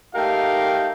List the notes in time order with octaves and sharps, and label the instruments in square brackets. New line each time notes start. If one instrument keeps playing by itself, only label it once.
[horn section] A3 D#4 G4 A#4 F5 G5